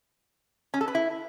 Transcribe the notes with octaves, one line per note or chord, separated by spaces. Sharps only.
C#4
A4
B4
E4